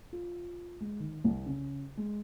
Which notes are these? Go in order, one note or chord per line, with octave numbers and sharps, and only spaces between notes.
F4
G#3
D#3
C2
C#3
G#3